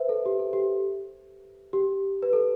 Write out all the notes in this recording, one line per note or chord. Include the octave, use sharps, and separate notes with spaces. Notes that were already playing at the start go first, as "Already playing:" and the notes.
Already playing: B4 C5 E5
A4
G4
A4
G4
G4
B4
A4